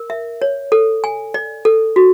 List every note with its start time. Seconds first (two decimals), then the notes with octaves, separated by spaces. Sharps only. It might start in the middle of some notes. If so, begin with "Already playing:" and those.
Already playing: A#4
0.10 E5
0.42 C#5
0.72 A4
1.04 G#5
1.34 D5
1.65 A4
1.96 F#4